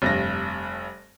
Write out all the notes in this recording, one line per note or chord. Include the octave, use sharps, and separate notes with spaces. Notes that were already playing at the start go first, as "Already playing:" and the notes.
F1 G2 A#6